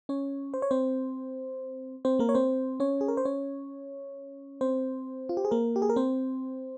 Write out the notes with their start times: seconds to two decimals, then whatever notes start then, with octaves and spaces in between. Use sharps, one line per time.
0.09 C#4 C#5
0.54 C5
0.62 C#5
0.71 C4 C5
2.05 C4 C5
2.19 A#3 A#4
2.29 C#5
2.35 C4 C5
2.80 C#4 C#5
3.01 G#4
3.08 A#4
3.17 C5
3.25 C#4 C#5
4.61 C4 C5
5.29 F4
5.37 G4
5.45 G#4
5.51 A#3 A#4
5.76 G4
5.82 G#4
5.89 A#4
5.96 C4 C5